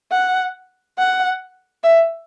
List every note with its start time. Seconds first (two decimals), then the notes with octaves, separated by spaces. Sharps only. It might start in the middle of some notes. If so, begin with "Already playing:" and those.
0.12 F#5
0.98 F#5
1.83 E5